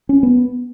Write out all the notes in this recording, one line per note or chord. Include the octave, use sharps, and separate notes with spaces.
C#4
B3